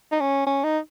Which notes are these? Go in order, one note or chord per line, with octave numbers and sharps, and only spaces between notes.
D#4
C#4
C#4
D#4